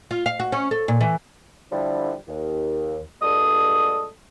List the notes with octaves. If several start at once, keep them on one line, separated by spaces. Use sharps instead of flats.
F4
F5
F#4
C#4
A4
A#2
E3
D3 F3 G3 E4
D#2
G2 A#2 G3 G#3 A4 D#6